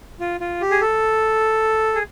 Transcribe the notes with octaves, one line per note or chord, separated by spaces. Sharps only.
F4
F4
G4
G#4
A4
G#4